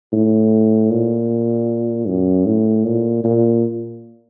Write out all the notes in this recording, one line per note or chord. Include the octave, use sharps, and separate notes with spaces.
A2
A#2
F#2
A2
A#2
A#2